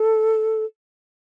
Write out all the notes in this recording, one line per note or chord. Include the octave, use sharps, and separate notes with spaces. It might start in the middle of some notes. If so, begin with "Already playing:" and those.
Already playing: A4